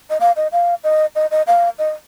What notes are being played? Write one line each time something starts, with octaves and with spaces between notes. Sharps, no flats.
D#5
F5
D#5
F5
D#5
D#5
D#5
F5
D#5